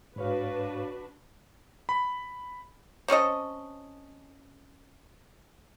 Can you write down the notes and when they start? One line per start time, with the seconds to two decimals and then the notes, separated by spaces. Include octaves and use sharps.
0.16 G#2 D4 F#4 B4 C#5 F5
1.89 B5
3.08 C4 C#4 A4 D#5